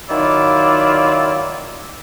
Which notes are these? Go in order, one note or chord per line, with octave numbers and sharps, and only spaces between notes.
D#3 F#3 E4 F4 D5